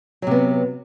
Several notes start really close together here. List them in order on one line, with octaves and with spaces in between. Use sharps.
F#3 C3 B3